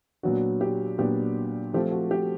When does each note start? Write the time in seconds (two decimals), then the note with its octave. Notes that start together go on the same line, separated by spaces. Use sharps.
0.23 A#2 F#3 B3 D4 F#4
0.61 G4
0.98 A#2 F#3 B3 D4 G4
1.74 F3 A3 C4 G4
1.92 F#4
2.11 G4